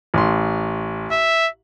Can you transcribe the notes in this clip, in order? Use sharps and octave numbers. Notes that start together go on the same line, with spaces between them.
A1 C6
E5